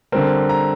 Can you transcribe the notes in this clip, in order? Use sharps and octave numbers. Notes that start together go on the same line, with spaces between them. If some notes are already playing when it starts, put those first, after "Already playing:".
D3 G3 C4 A#4
A#5